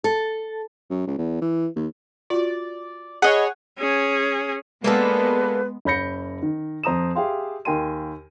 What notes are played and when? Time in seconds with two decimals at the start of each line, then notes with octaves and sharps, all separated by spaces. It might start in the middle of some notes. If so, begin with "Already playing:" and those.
0.04 A4
0.90 F#2
1.07 C#2
1.18 E2
1.42 E3
1.76 D#2
2.30 F4 F#4 D5
3.22 G#4 C#5 D#5 F#5 B5
3.78 C#4 G#4
4.84 G#3 A#3 B3 D4 A4 B4
5.85 F#1 C#5 B5 G6 A#6 C#7
6.42 D#3
6.83 F2 C5 A#5 D#6 E7
7.15 G4 G#4 E5 F5 G5 C6
7.65 D#2 A#4 G5 G#5 C6 D#7